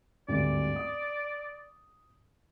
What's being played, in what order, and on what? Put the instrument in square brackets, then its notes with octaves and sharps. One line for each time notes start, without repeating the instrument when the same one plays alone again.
[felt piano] G#1 D2 G2 [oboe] D5
[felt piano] D#6